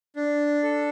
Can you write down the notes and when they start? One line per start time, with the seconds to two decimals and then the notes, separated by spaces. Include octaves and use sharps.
0.16 D4
0.63 A4